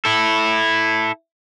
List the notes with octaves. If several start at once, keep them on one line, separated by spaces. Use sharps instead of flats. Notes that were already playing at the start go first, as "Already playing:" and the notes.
E4 A4